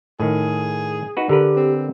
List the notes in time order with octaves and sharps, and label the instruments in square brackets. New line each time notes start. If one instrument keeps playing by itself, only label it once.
[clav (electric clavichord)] A2 D#3 [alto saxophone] G#4
[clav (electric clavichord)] D#4 F#4 B4
[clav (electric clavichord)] D3 A#4 B4 [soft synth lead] G4
[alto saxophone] C4